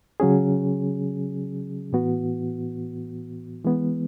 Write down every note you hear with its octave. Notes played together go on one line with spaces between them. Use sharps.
C#3 F#3 C#4 G#4
A2 E3 B3 F#4
E3 G#3 B3